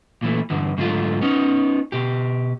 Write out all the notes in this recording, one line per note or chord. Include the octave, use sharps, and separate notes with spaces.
A#2 E3 A3
G2 D3 E3
G#2 D3 F#3 A3 F4
B3 C#4 D#4
B2 G4